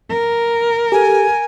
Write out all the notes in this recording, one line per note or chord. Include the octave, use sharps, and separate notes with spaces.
A#4
G4 A4 G#5